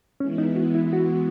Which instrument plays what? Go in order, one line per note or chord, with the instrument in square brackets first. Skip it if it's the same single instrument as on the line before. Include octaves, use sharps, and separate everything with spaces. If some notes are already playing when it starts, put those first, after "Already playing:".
[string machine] E3 G#3 B3 E4 [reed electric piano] C#4
[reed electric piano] D#4
F#4
E4
F#4